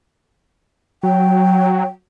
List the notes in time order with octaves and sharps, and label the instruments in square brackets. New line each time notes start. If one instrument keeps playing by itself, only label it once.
[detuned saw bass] F#3 [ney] G5